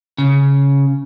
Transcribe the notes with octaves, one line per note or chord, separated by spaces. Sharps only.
C#3